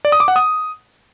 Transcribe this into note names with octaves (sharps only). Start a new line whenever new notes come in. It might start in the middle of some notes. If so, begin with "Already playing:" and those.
D5
D#6
D6
F#5
D#6